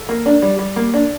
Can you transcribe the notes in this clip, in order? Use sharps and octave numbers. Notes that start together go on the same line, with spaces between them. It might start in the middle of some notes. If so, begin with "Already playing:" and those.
Already playing: A4
A#3
D4
G3
G3
A#3
D4